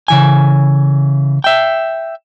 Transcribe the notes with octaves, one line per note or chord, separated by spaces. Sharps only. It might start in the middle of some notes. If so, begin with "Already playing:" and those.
C#3 E3 G#5
E5 G5